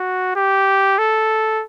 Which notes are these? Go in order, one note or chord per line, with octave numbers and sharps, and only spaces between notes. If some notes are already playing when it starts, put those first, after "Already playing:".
Already playing: F#4
G4
A4